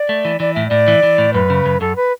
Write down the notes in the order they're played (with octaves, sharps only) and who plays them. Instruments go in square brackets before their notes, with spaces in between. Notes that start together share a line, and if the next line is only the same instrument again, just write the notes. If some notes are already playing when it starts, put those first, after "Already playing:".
Already playing: [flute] D5
[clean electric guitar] A3
E3
[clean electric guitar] E3 [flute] D5
[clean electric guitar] A2 [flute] E5
[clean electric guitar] A2 [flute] D5
[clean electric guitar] E3
E3
A2
[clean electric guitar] F#2 [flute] B4
[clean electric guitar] C#3
F#2
[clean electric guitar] F#2 [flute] A4
[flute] B4